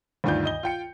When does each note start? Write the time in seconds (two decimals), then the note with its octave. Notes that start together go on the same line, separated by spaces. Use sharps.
0.24 D2 G2 D#3 F4 D5 G6
0.45 D#5 G7
0.63 F4 G5 C#7